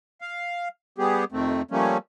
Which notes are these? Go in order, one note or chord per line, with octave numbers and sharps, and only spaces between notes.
F5
G3 B3 G4 G#4
F2 C3 D#3 A3 C4
F3 G3 A3 A#3 C#4